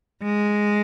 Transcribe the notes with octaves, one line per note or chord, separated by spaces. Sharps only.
G#3